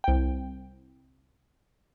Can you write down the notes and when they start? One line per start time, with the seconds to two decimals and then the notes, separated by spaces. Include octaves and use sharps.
0.04 C2 G5